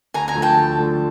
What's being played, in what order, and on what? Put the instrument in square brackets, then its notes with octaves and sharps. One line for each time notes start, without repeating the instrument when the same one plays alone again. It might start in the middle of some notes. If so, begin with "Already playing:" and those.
[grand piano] D2 [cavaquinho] G#5 A#5
[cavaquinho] G#5 A#5
[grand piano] D3 F3 A3
[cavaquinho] G5 A5
[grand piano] D2
D3 F3 A3